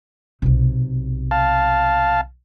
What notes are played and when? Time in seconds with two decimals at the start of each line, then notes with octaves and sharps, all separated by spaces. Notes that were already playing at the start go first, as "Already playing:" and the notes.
0.42 B1 C3
1.31 F5 A5